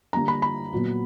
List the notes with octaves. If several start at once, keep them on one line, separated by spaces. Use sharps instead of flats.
D3 G3 A#3 D4 A#5
B5
B5
A#2 F#3 B3